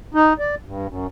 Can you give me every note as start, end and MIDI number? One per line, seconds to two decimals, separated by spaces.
0.14 0.33 63
0.39 0.55 74
0.65 0.87 43
0.87 1.07 42